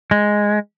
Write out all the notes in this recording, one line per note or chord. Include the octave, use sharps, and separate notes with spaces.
G#3